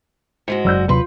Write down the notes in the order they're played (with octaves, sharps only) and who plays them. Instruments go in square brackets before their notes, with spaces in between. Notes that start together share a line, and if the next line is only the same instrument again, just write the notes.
[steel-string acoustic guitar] G#2 G#3 F#4 [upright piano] C#7
[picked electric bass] F#1 F#3 [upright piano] D5 E6 G6
[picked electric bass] D#2 C3 F#3 [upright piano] F4 C6 [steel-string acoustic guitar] B4